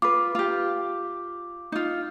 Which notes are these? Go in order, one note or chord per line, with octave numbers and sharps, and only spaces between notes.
F4 B4 D6
F4 G4
D#4 F4